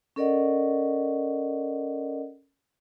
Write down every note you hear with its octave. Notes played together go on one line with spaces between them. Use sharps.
C#4 A4 A#4 D5 D#5 F#5